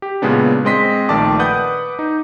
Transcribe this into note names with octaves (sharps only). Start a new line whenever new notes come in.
G4
A#2 C#3 G#3 B3 D4
G#3 C4 D#5 C6 B6
A#1 D#3 A3 D5 A5 D6
B4 F#5 D#6 G6
D#4